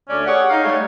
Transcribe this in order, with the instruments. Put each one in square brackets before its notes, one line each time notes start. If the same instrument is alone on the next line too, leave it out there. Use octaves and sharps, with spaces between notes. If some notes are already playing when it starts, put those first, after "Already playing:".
[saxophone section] D2 A3 D5 [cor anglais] C#4
[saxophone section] G4 G#4 C#5 [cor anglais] F#5
[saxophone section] D#4 F5
[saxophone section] G3 A3 [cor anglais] C#5